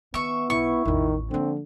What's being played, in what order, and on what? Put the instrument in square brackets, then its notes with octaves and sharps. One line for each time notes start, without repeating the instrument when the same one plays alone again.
[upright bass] D#3 [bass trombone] B3 [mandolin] E5 C#6
[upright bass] B1 [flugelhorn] E4 [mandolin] C#6
[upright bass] A1 E2 [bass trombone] D#3
[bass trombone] D3 [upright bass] F3 A#3 [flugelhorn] C4